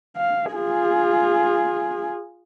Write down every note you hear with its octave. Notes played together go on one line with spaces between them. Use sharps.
F5
F4 G#4